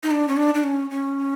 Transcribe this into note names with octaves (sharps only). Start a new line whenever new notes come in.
D#4
D4
C#4
D4
D4
C#4
C#4